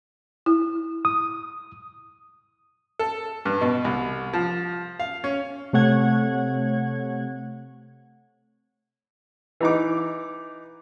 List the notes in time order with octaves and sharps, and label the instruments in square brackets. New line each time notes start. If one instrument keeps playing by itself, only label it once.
[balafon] E4
[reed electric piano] D#6
[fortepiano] A4
G2
B2
C2
F3
F5
C#4
[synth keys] C3 A3 C#5 F#5 G#6
[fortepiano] E3 D#4 D6